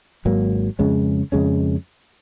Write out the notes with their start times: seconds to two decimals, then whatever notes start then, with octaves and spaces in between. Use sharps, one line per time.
0.25 G#1 G#2 F#3 A#3
0.79 F2 C#3 G#3 C#4
1.32 F2 C#3 G#3 C#4